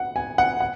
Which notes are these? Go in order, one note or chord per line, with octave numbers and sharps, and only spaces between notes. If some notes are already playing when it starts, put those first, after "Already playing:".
Already playing: F#5
G#5
F#5
F#5